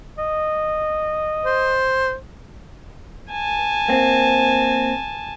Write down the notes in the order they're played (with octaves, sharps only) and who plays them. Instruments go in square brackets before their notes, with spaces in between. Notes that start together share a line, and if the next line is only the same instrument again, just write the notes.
[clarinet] D#5
[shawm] C5
[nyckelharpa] G#5 A5
[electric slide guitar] A#3 C4